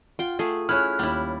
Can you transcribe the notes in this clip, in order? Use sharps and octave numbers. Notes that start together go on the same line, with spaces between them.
F4 F#5 G5
A3 F4 G#4
C#4 E4 G#4 G#5 F6 F#6
D#2 G3 E4